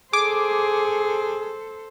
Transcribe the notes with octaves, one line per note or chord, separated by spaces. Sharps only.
G#4 A4 C5 D6